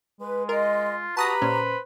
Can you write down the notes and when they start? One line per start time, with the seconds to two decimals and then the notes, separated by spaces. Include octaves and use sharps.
0.20 G#3 B4
0.49 F4 A#4 D#5
1.17 F#4 G4 B4 A5 A#5 D#6 A#6
1.42 A#2 C#4 C5